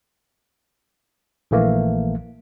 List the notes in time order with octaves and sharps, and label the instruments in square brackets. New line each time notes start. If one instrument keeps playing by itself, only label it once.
[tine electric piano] A#1 E3 A3 A#3